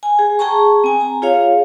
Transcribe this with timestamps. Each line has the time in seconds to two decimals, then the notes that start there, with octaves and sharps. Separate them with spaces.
0.03 G#5
0.19 G#4
0.39 G#4 G5 A5 A#5 C#6
0.84 C4 G#5
1.01 A#5
1.22 F4 G#4 C#5 F5